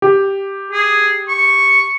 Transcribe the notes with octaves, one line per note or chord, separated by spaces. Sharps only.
G4
G#4
C#6